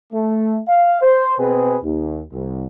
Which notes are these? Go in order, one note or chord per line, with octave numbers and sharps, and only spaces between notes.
A3
F5
C5
B2 C4 G#4 B4
D#2
C2